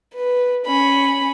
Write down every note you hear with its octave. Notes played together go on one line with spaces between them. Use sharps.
B4
C#4 B5